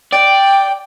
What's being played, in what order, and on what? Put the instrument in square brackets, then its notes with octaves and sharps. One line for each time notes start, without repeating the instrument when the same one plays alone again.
[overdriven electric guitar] D5 [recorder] G5